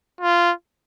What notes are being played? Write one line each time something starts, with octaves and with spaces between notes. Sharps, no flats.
F4